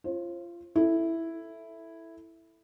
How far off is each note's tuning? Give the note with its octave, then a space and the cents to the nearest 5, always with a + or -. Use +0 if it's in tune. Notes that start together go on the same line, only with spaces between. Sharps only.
F4 -25 C5 +35
E4 +0 A4 +0